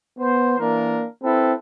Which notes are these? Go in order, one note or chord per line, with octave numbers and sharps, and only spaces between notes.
B3 C5
E3 A#3 D4 A#4
C4 E4 A4 B4